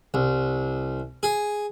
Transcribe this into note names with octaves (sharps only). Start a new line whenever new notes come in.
C2
G#4